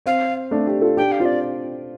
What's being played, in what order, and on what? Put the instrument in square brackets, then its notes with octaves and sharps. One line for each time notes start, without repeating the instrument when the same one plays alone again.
[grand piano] C4 [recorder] F5
[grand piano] A3 D4
D4 G4
F4 A4
[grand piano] D4 G4 [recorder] G5
[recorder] F5
[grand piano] C4 F4
[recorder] D5